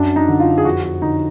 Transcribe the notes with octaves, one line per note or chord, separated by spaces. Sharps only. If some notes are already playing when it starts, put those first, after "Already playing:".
Already playing: F#2 D4
D#4
D3
F4
G#4
F2 F#4
F#4
D3 D#4